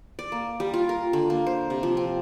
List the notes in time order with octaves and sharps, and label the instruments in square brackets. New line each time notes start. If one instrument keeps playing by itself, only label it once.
[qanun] D5
A#3
G3
F4
A#4
D3
A#3
C5
C3
F3
C4